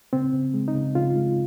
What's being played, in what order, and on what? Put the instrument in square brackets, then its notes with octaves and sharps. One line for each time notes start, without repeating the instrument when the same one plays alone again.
[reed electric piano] C#3 C4
C#3
G#3
D#4
C#3
C#3 F4
G#3